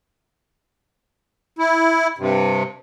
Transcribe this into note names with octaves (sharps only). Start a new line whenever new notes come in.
E4
G2 C3